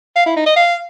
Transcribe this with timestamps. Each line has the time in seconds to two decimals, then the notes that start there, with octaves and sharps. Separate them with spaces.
0.16 F5
0.26 E4
0.36 D#4
0.46 D#5
0.56 F5